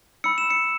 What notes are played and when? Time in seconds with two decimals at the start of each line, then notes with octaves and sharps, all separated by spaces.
0.24 B5 E6 C#7
0.38 E7
0.50 C#7